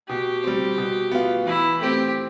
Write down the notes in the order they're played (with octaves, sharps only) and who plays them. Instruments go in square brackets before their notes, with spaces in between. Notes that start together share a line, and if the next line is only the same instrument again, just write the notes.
[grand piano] B2 [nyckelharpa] G4
[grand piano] G3 C4
B2
B3 F4
[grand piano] E3 [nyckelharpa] E4
[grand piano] A3 C4 [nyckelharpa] G4